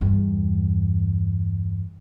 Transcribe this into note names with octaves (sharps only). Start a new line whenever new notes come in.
E2 G2